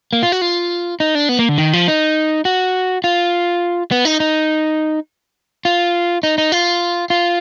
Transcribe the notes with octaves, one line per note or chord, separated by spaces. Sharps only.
A#3
F4
F#4
F4
D#4
D4
B3
A#3
D3
D#3
F3
D#4
F#4
F4
B3
D#4
D#4
F4
D#4
D#4
F4
F4